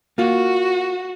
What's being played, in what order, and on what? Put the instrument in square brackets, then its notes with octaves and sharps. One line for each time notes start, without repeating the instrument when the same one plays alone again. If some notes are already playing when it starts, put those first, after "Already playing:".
[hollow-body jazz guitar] A#3 F4 [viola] F#4